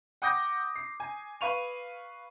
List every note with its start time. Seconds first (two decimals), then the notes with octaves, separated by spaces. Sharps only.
0.22 F#5 G5 D6 D#6 G6 A#6
0.75 C7
1.00 G#5
1.41 B4 F5 C#6 D#7 F7